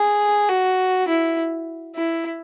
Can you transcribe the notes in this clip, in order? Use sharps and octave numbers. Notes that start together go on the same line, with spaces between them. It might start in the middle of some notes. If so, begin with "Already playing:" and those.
Already playing: G#4
F#4
E4
E4